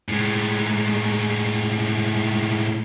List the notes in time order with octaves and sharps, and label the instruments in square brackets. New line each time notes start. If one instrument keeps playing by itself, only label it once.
[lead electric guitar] A2 G#3